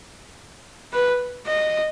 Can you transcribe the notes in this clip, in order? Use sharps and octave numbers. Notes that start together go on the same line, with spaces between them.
B4
D#5